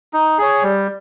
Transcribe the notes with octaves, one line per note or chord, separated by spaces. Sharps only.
D#4
G#4 C#5
G3